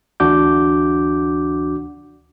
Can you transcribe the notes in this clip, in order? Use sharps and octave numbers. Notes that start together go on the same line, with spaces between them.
D2 E3 D4 F#4 D6 G6